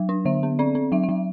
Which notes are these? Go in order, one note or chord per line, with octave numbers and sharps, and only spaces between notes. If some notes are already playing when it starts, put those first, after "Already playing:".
Already playing: F#3
D4
D3 E5
B3
C4 D5
C4
F#3 E5
E5
F#3